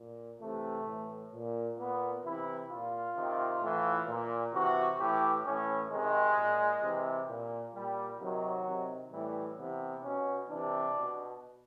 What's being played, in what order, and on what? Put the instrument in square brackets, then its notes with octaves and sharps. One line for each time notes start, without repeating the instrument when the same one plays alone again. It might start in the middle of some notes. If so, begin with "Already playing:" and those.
Already playing: [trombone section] A#2
C3 E3 A3
A2 E3
A#2
A#2 B3
C3 E3 E4
A#2 F4
C3 D#3
A2 E3
A#2
C3 E3 F#4
A2 E3 G4
A2 E3 C#4
C3 D#3 G#3
A#2
C3 E3
A#2
A#2 G3
C3 D#3 F#3
C3 D#3
A2 E3 G3
C3 E3 B3
B2 C#4
C3 E3 D4
B2